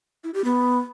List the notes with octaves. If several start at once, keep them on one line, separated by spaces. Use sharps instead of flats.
E4
G4
B3